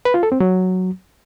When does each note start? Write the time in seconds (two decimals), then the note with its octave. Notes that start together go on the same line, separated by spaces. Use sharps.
0.05 B4
0.14 F4
0.23 A4
0.32 C4
0.40 F#3